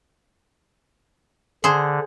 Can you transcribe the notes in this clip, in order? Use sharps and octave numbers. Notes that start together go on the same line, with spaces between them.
D3 G#4 C5